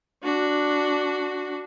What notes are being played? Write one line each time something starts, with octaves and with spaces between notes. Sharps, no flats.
D4 F#4